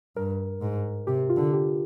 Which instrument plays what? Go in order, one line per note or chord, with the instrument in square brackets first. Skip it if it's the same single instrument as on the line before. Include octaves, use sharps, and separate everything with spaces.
[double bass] G2 [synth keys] A#4
[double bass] G#2
[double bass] C3 [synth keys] G4
[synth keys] F4
[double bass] D3
[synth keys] G4